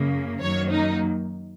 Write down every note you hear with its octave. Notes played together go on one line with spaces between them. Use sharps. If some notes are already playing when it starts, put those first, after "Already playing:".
Already playing: F#2 C#3 A#3
F#2 D#3 F#3 A#3 C#5
D#4